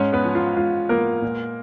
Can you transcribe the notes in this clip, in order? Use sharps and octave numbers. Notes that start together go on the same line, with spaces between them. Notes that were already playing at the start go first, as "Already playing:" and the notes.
Already playing: G#2 C#4 C#5
B3 B4
F3
F4
G#2 F4
A#3 B3 A#4
A#2